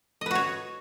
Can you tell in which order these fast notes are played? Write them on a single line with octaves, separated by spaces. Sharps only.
D#5 B4 F#4 C#5